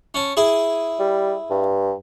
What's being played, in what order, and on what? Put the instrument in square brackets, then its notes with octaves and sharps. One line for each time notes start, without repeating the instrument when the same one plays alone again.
[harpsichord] C#4 A5
E4 G#4
[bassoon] G3
G2